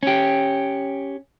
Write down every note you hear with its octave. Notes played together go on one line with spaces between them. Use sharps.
C#4 G4